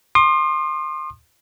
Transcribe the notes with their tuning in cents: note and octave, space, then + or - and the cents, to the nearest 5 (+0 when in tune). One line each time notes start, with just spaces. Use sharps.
C6 +25 D#6 -45